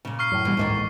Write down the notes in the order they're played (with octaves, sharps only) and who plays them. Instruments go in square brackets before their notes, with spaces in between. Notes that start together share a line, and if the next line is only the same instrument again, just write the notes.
[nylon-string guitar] A#2 C#3
[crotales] C#6 F6 C7
[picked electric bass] F#2 A2
[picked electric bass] A1 B2 [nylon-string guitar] E3 G3
[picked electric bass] D1 A1 G#2 [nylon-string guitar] D#3 A#3 D4